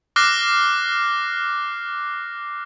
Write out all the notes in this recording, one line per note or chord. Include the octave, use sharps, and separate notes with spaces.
D6 F6 F#6 A#6 C7